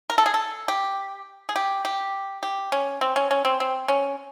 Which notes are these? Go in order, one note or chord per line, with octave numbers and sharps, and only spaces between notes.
A#4
A4
G#4
A4
G4
G#4
G4
G4
G4
C#4
C4
C#4
C#4
C4
C4
C#4